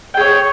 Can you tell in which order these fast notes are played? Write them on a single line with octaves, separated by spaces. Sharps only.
G5 G#4 C#5